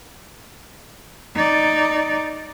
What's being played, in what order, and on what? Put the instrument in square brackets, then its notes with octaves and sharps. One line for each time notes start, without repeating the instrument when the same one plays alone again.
[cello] D#4 D5